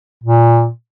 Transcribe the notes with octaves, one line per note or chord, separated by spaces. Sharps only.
A#2